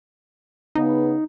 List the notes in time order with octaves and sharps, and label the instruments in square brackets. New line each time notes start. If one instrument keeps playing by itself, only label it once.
[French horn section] C#3 B3 [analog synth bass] D#4